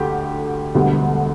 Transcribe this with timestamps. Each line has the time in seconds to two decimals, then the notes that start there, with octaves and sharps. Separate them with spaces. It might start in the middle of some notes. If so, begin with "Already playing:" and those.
Already playing: D2 D3 A3 G4
0.74 E1 D2 D3 G3 B3